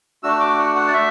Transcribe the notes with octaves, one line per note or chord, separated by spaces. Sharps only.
A3 D4 F#4 E6
D6
F#5
F#5
D5
A3 E5